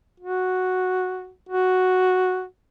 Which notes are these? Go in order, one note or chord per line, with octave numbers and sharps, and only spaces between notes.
F#4
F#4